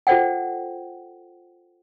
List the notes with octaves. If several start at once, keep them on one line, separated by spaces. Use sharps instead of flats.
F4 A4 C5 D5 F#5 G5